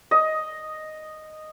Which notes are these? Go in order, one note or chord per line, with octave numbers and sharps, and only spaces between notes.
D#5